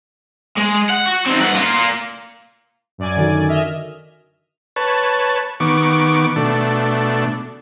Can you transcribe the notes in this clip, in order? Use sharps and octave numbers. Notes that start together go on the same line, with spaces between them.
G#3
F#5
F#4
C4 D#4
G2 F#5
A#3 F4
F#2 D5 G#5
D3 D#3 F#4
D#5 E5 F6
B4 C#5 A5
D#3 B3 C#6 D6
B2 A3 D4